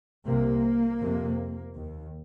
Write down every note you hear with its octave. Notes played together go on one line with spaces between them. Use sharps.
C2 C3 A#3
F2 C3
D#2